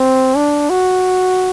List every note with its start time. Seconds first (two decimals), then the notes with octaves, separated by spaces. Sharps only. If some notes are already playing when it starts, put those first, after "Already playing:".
Already playing: C4
0.36 D4
0.70 F#4